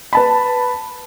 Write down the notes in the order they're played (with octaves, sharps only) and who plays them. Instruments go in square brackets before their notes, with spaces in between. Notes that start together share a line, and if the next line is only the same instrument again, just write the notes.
[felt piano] B4 A5 B5